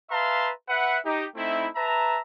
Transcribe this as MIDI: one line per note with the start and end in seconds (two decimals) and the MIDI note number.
0.11 0.51 71
0.11 0.51 76
0.11 0.51 77
0.11 0.51 81
0.11 0.51 82
0.11 0.51 84
0.69 0.98 71
0.69 0.98 76
0.69 0.98 78
1.05 1.27 63
1.05 1.27 67
1.36 1.69 57
1.36 1.69 60
1.36 1.69 63
1.36 1.69 64
1.76 2.19 71
1.76 2.19 76
1.76 2.19 81
1.76 2.19 82